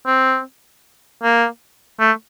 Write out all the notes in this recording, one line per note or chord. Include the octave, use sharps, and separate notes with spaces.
C4
A#3
A3